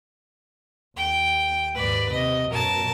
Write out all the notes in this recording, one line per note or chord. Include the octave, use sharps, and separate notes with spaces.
D#2 G5
D#2 G#2 B4 D5
C3 D#5
F#2 B2 A#4 A5